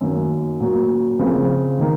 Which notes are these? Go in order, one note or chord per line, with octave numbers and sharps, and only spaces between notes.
F#2 D#3 A#3
A#2 F#3 A#3
C#3 F3 C4 F4 A#4
D#3 A#3